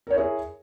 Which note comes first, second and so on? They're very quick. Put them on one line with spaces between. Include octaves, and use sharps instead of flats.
A#4 C#5 E4 G#4